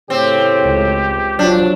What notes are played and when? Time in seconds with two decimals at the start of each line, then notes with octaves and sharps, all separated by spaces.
0.10 A2 C#3 C4 G4 C#5
0.62 C#2
1.39 F3 F#3 D4